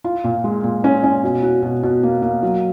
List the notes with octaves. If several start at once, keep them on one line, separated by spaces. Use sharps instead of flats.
F4
A#2
G#3
A#2
C#4
C#4
B2
F#4
B2
B2
A#3
A#3
F#3